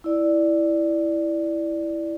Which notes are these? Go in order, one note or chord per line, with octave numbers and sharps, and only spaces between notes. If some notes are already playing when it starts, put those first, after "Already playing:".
E4 D5